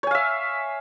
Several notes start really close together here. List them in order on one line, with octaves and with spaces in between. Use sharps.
C#5 G#5 F5 E5